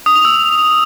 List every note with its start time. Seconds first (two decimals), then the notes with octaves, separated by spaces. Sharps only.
0.06 D#6
0.16 F7
0.25 E6